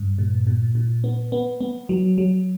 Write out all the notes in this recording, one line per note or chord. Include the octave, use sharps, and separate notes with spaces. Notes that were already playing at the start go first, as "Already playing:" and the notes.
Already playing: G2
A#2
A#2
A#2
B3
B3
B3
F#3
F#3